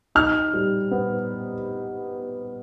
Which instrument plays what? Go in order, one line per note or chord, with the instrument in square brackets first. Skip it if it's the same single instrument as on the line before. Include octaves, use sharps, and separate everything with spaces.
[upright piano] D#4 [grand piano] F6
[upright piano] G3
B3